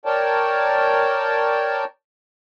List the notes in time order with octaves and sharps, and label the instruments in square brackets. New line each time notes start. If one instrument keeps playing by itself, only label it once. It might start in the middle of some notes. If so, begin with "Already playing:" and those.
[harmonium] A#4 C#5 D5 G5 A5